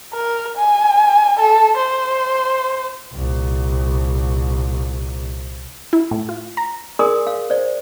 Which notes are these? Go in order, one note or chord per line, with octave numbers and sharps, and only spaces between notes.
A#4
G#5
A4
C5
C2 A#2
E4
A2
F4
A#5
G#4 A#4 D5 G#5 C6 D#6
F5
C5 D5